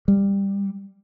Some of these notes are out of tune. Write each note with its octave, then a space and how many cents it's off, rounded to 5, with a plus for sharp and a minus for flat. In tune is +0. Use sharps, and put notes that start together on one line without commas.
G3 +15